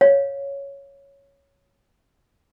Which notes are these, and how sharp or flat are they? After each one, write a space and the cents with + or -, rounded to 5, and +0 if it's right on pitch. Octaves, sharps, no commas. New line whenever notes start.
C#5 +0 F5 +0